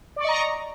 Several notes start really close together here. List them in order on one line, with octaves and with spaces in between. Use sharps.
D5 C#6 D#5 A#5